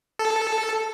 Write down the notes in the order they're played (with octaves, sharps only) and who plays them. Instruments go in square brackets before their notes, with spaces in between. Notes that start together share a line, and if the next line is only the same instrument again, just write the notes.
[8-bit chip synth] A4